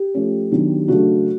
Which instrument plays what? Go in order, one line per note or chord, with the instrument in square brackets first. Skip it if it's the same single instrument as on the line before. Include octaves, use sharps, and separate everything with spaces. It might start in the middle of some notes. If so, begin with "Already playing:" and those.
Already playing: [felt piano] G4
F3 A3 C#4
D#3 F#3 B3 D4
C#3 F#3 A3 D4 F#4